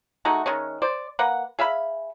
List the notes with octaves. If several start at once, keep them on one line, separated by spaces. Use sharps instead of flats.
G#3 A3 D#4 F#4
D#3 G#3 C#4
C5 D5
A#3 B4 F#5
G#4 E5 F5 B5